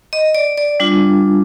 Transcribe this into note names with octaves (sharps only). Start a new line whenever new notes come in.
D#5
D5
D5
G3 D4 F4